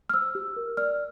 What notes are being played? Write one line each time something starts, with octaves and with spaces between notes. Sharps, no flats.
F6
C5 E6
G4
A#4
D5 F6